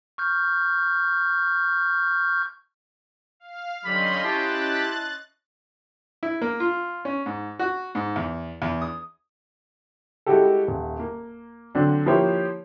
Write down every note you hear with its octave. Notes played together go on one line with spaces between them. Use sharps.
C#6 F6 G6
F5
D3 F#3 G3 C#4 D#5 B5 C6
E4 G4 A5 F#6 A6
E4
A#3
F4
C#4
G#2
F#4
G#2
E2
E2
D#6
G3 G#3 E4 F#4 G4 A4
D#1
A#3
D3 F#3 C4 D4
F3 A#3 E4 G4 C5 C#5